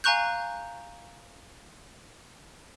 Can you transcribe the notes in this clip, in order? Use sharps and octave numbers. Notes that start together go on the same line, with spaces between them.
F5 G#5 A#5 C#6 F#6 G6